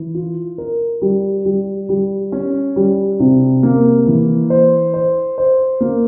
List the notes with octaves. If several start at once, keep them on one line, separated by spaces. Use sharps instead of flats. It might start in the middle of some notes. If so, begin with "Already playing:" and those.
Already playing: E3
F4
A#4
G3
G3
G3
C#4
G3
C3
A#3
E3
C5
C5
C5
A#3